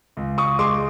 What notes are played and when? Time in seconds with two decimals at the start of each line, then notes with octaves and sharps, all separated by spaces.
0.17 C#2
0.38 C#6 D#6
0.59 G#3 C6 D6